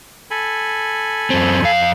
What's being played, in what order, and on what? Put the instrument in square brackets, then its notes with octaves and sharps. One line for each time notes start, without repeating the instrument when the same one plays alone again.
[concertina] A4 G#5 B5
[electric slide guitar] F#2 C4
F2 F5